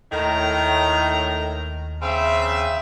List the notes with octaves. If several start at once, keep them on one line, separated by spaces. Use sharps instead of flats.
D#2 A2 D#3 A#5
C#3 C4 E5